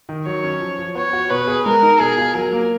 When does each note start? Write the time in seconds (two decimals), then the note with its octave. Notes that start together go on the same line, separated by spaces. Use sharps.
0.09 D#3
0.26 F#3 C#5
0.44 C#4
0.61 F3
0.79 F3
0.95 B3 C#5
1.13 F#4
1.30 B2 B4
1.47 G#4
1.65 G#3 A#4
1.82 D#4
2.00 B2 G#4
2.18 F4
2.34 F#3 A#4
2.53 A#3